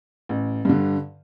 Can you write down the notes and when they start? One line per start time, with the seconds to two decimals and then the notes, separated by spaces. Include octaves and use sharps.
0.29 A1
0.65 G2 D3